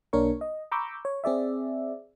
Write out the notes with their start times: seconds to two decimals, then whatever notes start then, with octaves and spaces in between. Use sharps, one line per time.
0.13 B1 A#3 D4 A#4 C#5 C#6
0.41 D#5
0.72 A#5 B5 C#6 D6 E6 G6
1.05 C#5
1.24 C4 G#4 D5 E5